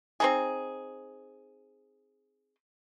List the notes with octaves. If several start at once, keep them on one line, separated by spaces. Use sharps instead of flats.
C4 D#4 G#4